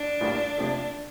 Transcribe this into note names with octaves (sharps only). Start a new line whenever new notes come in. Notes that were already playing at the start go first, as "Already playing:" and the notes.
Already playing: D4
A#1 A2 G3 A#3 F4
F2 C3 F3 A3